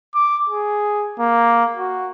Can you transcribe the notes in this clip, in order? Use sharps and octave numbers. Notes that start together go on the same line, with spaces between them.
D6
G#4
A#3
F#4